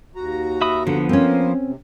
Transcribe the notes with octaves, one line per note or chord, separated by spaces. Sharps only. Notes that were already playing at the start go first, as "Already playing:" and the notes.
D#2 F#4 A#5
E5 B5 D#6
D3 F3 B3
A#3 C4 C#4 A#4 C5
C3